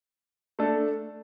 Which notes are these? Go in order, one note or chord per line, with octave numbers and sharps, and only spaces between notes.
A3 D4 A4